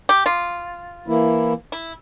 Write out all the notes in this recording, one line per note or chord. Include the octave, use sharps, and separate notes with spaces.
G4
F4
E3 A#3 E4
E4